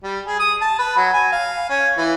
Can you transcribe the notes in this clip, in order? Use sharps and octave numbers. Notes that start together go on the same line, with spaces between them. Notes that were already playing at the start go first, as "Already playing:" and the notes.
G3
G#4
D#6
A5
B4
F#3
G#5
F5
C#4
E3